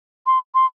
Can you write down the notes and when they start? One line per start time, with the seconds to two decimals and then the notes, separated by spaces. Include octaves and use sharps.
0.27 C6
0.55 C6